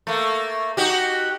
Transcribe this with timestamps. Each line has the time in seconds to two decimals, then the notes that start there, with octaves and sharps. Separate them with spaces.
0.07 A3 A#3
0.77 D#4 F#4 G4